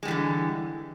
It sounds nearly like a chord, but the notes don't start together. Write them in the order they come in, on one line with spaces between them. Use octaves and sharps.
G#3 G3 E3 D3